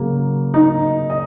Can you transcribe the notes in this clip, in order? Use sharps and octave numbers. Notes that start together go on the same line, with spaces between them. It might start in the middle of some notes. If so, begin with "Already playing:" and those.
Already playing: C#3 F#3 A#3
D#4
D#5